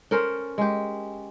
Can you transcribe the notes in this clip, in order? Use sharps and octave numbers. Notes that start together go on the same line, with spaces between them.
C#4 A4 A#4 C5
G#3 G4